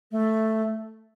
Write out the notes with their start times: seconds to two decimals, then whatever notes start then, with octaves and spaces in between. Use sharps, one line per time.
0.11 A3